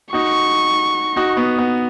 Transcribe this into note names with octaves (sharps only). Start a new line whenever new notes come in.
D#4 F#4 C#6
D#4 F#4
B3
B3